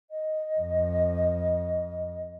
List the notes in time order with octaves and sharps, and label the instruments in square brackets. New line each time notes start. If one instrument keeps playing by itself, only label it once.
[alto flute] D#5
[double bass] F2